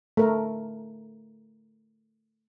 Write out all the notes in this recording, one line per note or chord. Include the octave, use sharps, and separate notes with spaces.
A3 A#4